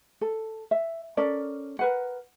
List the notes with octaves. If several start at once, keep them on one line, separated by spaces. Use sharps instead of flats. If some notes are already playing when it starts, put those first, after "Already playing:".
A4
E5
C#4 A4 A#4 D5
A#4 B4 F#5